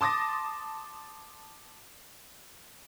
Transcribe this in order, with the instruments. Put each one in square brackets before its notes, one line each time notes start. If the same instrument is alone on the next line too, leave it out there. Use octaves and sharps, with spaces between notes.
[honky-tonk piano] A5 C6 D6 D#6 A6 A#6